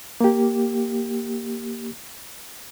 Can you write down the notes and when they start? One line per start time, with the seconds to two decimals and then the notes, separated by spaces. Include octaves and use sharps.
0.21 A#3 G4